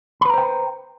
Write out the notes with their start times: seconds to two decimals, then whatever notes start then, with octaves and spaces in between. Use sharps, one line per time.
0.21 B5
0.25 B4
0.30 A#5
0.34 C5
0.38 G5